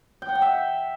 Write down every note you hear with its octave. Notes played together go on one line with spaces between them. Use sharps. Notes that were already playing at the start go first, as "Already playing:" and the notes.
G5
F#5
G5
E5